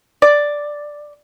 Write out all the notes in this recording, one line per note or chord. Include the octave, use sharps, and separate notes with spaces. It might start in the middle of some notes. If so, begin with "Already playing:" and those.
D5